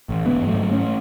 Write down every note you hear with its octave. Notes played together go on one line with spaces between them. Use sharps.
A1
A1 G#3 B3
G#2
F#3 A3
G#2
A3 C#4